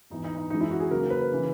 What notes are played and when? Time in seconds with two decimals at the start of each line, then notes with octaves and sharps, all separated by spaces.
0.10 G#2 E3 B3 D#4
0.24 D#4
0.37 D#4
0.50 F#2 E3 G#3 D#4
0.60 E4
0.71 F#4
0.80 G#4
0.90 C#3 F#3 A#3 A#4
1.10 B4
1.32 C#3 E3